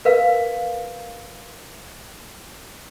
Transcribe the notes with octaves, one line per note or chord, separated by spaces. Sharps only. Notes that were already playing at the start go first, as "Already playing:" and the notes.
A#4 B4 F5